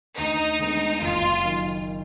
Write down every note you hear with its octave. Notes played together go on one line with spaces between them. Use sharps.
D2 D#4
D3 G#3 B3
F#1 F4
F#2 D#3